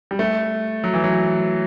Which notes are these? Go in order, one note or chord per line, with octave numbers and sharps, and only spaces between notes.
G3
A3
F#3
E3
F#3